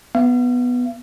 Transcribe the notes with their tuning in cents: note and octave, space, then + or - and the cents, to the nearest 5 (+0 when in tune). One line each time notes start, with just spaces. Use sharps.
B3 +0 F5 -40